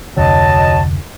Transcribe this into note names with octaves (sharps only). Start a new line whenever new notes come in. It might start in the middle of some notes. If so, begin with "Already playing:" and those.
F1 D2 F#3 D#5 A5